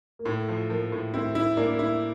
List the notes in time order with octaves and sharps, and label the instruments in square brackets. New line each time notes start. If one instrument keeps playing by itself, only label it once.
[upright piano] A#3
[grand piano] A2 [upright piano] A3
[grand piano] F3
[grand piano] F3 [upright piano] A#3
[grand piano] A2
[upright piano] C4 [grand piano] E4
[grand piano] E4
[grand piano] A#3 [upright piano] D4
[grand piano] E4